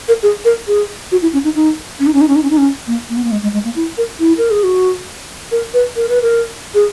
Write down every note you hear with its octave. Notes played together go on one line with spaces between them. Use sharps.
A#4
G#4
A#4
G#4
F#4
E4
C#4
D#4
D#4
C#4
D#4
C#4
D#4
C#4
D#4
C#4
D#4
C#4
A#3
A#3
B3
A#3
G#3
G#3
G#3
A#3
E4
A#4
E4
A#4
G#4
F#4
A#4
B4
A#4
B4
A#4
G#4